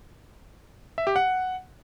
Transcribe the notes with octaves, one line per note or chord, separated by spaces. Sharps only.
E5
G4
F#5